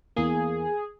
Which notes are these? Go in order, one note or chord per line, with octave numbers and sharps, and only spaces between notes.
E2 A#3 G#4